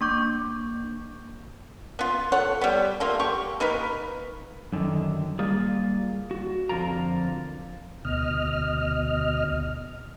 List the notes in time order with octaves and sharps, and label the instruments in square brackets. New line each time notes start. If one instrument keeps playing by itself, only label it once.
[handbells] A#3 D4 C#6 D6 G6
[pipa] B3 F4
A4 C#5 F#5
G3 B3
A3 A#3 F4
G4 C#6
A#3 D#4 A#4 B4
[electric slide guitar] F#2 D3 D#3
G3 A#3 F4 G#4
F#4
F2 D3 F3 F4 A#4 A#5
[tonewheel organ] D2 B2 D#5 F6